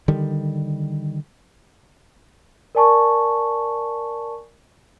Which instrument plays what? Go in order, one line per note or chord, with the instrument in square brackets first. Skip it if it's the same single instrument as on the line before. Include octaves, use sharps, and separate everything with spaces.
[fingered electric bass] D3 D#3 G3
[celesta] A#4 D5 G#5 A5 C#6